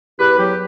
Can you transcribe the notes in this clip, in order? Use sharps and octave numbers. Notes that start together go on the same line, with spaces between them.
E2 G4 B4
F#3 G4